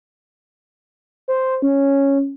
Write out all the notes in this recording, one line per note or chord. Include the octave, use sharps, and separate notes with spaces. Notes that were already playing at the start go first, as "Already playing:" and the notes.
C5
C#4